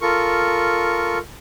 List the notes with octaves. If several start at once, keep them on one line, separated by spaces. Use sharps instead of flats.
F4 A4 A#4 C#6